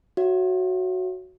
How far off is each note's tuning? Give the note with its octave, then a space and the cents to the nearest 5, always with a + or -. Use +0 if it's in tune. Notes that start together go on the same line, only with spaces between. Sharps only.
F#4 +0 C#5 +0 E5 +30